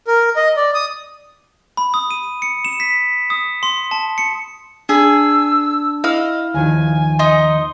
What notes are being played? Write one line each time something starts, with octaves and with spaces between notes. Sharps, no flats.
A#4
D#5
D5
D#6
B5
D#6
D#7
C#7
E7
B6
D#6
C6
A5
C#7
D4 G#4 E6
E4 D#5 F5 E6
D#2 D#3 F3 G#5
D#4 C6 D#6